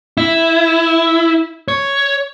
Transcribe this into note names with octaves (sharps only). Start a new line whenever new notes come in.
E4
C#5